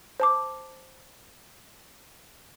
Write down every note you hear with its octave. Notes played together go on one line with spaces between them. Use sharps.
C5 A5 D6